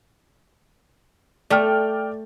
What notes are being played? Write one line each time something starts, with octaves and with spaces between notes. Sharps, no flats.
A3 D5 G5 F6